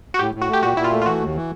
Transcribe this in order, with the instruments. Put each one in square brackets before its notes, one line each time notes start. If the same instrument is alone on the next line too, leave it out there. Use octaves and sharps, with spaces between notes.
[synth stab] F#4
[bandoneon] A2 [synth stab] G4
[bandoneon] A2
[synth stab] F#4
[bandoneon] A3 [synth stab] G4
[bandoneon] A#2 [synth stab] F#4
[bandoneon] A#2 [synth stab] E4
[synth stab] F4
[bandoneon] A3
[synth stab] F4
[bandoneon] E3 [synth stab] F#4
[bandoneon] D#2
E3